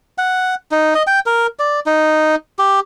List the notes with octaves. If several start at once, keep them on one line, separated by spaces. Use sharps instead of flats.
F#5
D#4
D#5
G5
A#4
D5
D#4
G4